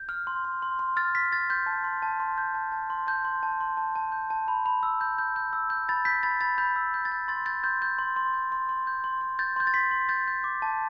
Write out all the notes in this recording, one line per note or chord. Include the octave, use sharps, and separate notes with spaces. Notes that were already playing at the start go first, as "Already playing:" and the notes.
Already playing: G6
F6
C6
C6
C6
C6
F6 A6
F6 B6
F6 A6
C6 G6
A5
C6
A5
C6
G6
A5
A5
C6
A5 G6
C6
A5
C6
A5
A5
G6
A5
B5
B5
E6
G6
G6
G6
E6
G6
B5 A6
G6 B6
B5 A6
B5 A6
B5 G6
E6
G6
A6
G6
C6 A6
G6 A6
C6 G6
G6
C6
C6
G6
C6
C6
G6
C6
C6
G6 A6
C6 G6
A6
C6 B6
C6
G6 A6
G6
D6
A5